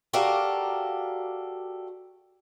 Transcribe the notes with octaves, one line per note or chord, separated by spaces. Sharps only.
F#4 G4 A4 A#4 D5 F5